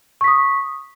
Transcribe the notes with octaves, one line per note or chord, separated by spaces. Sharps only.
C#6 D#6 B6